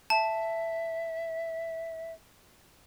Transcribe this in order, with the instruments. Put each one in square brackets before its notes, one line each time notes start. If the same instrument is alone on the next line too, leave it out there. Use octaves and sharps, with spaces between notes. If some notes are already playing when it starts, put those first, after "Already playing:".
[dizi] E5 [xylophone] A5